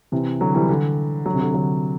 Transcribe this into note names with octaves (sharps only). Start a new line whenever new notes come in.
C3 E3
D3 F#3
E3 G3
D3
D3 F#3
C3
D3
D3 F#3